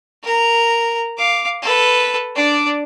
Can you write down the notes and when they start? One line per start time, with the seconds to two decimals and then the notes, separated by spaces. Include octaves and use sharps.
0.23 A#4 A#5
1.17 F5 D6
1.62 A4 B4
2.35 D4 D5